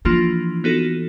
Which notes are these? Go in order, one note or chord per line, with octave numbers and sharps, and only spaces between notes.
E3 F3 A#3 D4 F4
B3 D#4 F#4 A4